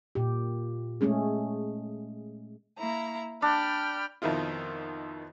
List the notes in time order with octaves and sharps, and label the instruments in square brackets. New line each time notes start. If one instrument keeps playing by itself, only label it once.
[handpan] A#2 G4
G#3 A3 C#4 G#4
[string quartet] A#3 E4 A#5
[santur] D4 [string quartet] G5 B5 F6
[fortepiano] F2 B2 D#3 E4 F4